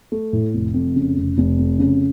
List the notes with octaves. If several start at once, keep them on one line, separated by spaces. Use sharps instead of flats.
A3
A2
F1
F2
C#3
F1
F1
F2
C#3